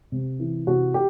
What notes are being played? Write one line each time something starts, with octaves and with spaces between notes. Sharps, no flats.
C3
E3
C3 F#4
G4